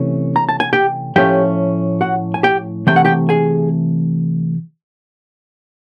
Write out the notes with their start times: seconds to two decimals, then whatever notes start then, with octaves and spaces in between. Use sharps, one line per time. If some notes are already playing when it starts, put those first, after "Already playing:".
Already playing: C3 E3 A3 C#4
0.36 A#5
0.49 A5
0.60 G#5
0.73 G4 G5
1.16 A2 F3 A3 C#4 G4 G5
2.01 F#4 F#5
2.34 G#5
2.43 G4 G5
2.87 C3 E3 A3 G5
2.96 F#5
3.05 G4 G5
3.29 G#4 G#5